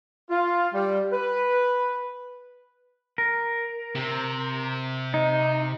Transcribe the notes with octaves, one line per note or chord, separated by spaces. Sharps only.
F4
G3
B4
A#4
C3
D#4